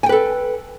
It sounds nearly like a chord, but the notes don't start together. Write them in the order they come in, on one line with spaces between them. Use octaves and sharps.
G#5 G5 B4 A4